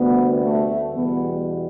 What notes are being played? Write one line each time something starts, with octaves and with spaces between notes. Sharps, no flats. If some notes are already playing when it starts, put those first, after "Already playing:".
Already playing: D2 C3 G3 B3
A3
E2 B2 G3 B3